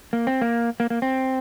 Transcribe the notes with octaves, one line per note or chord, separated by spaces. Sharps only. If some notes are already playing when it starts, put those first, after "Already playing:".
A#3
C4
A#3
A#3
A#3
C4